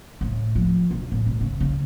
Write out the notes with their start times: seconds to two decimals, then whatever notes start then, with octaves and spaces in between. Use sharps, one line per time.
0.21 A2
0.55 F3
0.91 E1
1.12 A2
1.26 B1
1.41 C#3
1.60 C#3